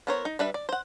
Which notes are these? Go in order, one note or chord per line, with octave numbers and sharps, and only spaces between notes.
B3 E4 A#4 C5 C#5
D#4
G3 D4 B4 E5
D5
C5 F#5